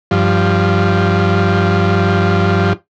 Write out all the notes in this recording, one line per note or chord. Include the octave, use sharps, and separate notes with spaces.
G2 F3